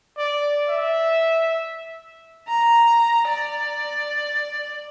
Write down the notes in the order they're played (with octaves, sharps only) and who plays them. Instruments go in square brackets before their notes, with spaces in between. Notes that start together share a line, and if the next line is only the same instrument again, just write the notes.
[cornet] D5
E5
[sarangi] A#5
D5